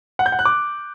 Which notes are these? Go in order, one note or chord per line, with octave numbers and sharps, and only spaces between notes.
F#5
G6
F#5
F#6
D6